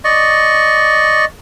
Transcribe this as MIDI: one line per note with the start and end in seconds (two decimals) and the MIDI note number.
0.04 1.25 74
0.04 1.25 75
0.04 1.25 85